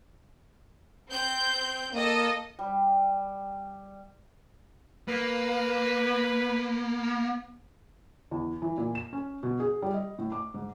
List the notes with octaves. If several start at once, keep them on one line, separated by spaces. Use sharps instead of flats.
C4 G6
A#3 A4 D#5
G3
A#3 B4
E2
E3
A#2
E7
C#4
B2
G#4
G3
D#5
A2
D6
G#2